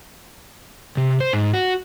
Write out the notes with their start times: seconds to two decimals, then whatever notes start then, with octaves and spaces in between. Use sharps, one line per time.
0.97 C3
1.20 C5
1.33 G#2
1.53 F#4